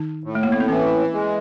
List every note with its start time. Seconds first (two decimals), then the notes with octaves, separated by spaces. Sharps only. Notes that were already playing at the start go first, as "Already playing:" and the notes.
Already playing: D#3 D#4
0.24 A2
0.35 A3
0.43 A#3
0.52 B3
0.60 C4
0.69 E3 C#4
1.13 G#3